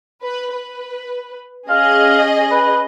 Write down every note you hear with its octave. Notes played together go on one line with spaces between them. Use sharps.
B4
B4
C#4 G#4 D#5 F5
B4